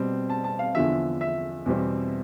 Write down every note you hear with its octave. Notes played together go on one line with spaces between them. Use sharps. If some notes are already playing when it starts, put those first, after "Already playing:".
Already playing: B2 G3 C4
A5
A5
F5
E2 D3 F3 E5
E5
E2 B2 G3 C4